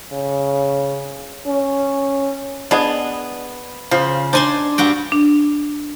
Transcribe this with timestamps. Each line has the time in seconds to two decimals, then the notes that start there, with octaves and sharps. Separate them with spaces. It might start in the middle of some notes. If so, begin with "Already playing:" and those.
0.12 C#3
1.46 C#4
2.71 B3 D4 G#4 D#5
3.91 C#3 F3
4.33 D4 D#4 C5 G#5 C6
4.78 G2 F#4 G5
5.12 D4